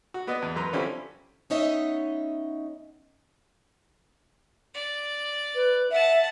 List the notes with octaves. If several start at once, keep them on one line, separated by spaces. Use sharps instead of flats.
F#4
B3 B4 D5 D#5
E2
F#2 B4 A#5 C6
D3 F3 G3 C4 C#4 E4
B3 C#4 D#4 C#5 D#5 E5
D5
B4
E5 F#5 A5